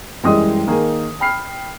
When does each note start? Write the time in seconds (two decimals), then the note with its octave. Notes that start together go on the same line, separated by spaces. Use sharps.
0.23 F#2 E3 G3 G#3 G5 D#6
0.67 D#3 A#3 G#4
1.20 G5 B5 F6 C7